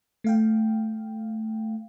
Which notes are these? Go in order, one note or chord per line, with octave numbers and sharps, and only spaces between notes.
A3 F5 G5